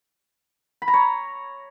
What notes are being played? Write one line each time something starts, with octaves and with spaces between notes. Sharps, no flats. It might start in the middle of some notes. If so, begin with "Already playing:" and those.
B5
A#5
C#5